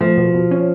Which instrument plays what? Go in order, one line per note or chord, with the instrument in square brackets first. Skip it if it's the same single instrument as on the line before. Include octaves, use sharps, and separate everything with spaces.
[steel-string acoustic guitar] F3 [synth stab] A3
[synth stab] B2
B2
C#4